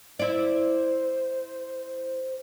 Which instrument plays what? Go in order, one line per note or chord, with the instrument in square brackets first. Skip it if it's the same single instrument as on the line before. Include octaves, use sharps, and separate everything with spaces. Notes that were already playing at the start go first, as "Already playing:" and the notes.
[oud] E4 D5 [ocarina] C5